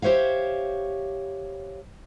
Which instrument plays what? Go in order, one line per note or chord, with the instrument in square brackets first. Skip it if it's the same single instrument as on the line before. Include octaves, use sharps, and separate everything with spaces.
[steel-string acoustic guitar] G4 C5 C#5 E5 F5